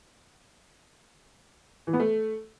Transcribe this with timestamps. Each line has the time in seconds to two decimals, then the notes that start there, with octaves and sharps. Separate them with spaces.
1.87 E3
1.93 B3
2.00 A3